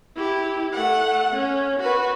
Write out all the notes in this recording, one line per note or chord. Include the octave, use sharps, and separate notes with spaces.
E4 G4
A3 F#5
C#4
F#4 B4